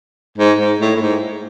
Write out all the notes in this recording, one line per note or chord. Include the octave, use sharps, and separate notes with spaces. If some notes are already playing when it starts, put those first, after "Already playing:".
G#2
G#2
A2
A2
G#2